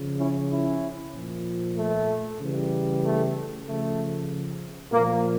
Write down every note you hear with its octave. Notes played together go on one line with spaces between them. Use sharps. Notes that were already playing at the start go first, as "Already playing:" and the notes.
Already playing: C#3 F3
C#4 E4
C#4 E4
A#2 F3
A3
C#3 E3 G3
A3
C#3 F3 A3
A#2 F3 A#3